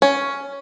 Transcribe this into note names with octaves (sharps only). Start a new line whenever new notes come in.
C#4